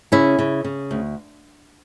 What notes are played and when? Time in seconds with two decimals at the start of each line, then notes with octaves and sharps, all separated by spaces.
0.12 C#3 C#4 E4
0.39 C#3
0.64 C#3
0.91 D2